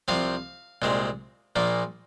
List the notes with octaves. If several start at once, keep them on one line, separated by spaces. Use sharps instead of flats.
C2 C3 F3 C4 F5
C2 A#2 G#3 C4
A#1 A#2 F3 A#3